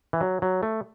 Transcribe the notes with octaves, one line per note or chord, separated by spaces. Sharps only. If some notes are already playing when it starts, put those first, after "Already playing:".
E3
F#3
F#3
A3